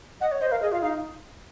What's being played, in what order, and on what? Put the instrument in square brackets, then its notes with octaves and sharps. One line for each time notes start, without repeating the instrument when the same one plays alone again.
[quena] D#5 [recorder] F#5
[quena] C#5
[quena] C5 [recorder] D#5
[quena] A#4 [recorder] F5
[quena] G#4 [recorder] D#5
[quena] F4 [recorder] F5
[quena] D#4 [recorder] F5